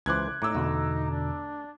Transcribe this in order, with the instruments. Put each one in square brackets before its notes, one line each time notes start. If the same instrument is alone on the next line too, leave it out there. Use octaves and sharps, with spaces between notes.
[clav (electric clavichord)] C#2 E3 C5 [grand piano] D6 F#6 G#6
[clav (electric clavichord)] A2 [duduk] D#4 [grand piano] A#5 D6 E6
[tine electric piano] E2 B2 D3 [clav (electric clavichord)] A3
[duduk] D4